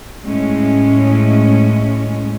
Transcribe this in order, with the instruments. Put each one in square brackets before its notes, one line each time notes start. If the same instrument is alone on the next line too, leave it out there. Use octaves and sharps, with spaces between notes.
[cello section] A2 G#3 C#4